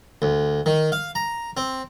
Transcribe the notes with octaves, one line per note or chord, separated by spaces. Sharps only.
D2
D#3
F5
A#5
C4